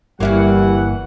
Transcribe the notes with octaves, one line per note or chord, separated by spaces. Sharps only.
G1 E3 G3 A#3 E4 F#4 F#5